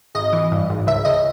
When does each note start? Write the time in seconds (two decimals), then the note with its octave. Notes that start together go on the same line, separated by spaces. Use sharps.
0.15 G#1 D#5
0.33 E3
0.51 G2
0.70 G#1
0.87 C#2 E5
1.05 C#2 D#5